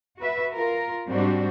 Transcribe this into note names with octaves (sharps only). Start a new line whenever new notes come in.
F#4 B4 E5
F4 A#4
G#2 G3 C4 D4 F#4